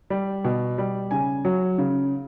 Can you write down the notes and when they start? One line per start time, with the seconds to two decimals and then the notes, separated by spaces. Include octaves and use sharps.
0.10 G3
0.44 B2
0.78 G3
1.11 C#3 G#5
1.45 F#3
1.78 C#3